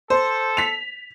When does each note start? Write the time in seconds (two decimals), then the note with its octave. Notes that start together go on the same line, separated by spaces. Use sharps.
0.10 A4 C5
0.57 B6 F7